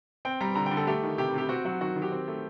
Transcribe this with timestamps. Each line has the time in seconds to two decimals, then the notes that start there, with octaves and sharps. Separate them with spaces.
0.25 C4 G5
0.40 G3 A#5
0.55 D3 A#5
0.66 G5
0.71 D3
0.77 A4
0.87 A3 G4
1.03 D#3
1.18 C3 G4
1.34 C3 G4
1.49 C4 F#4
1.65 F#3 F#4
1.80 D#3 F#4
1.96 D#3
2.02 G4
2.12 C4
2.28 A3